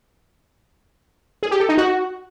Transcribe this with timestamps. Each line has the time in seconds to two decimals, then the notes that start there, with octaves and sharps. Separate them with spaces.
1.43 G#4
1.51 G4
1.60 A4
1.69 D#4
1.78 F#4